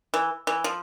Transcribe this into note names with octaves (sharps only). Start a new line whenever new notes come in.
E3
E3
F3